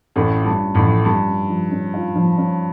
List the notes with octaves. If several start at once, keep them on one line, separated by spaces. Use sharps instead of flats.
A1 A2 C#4
F4
G2
A3
A1 A2
F3
G2 A3
C#4
F3
C#4
F4
F3
C#4